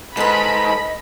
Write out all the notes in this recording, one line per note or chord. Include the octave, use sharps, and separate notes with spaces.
G#2 A4 B4 D#5 B5